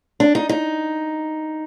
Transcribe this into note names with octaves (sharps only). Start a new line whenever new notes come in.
D4
D#4
D#4